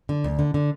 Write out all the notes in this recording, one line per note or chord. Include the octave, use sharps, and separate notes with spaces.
D3
D2
D3
D3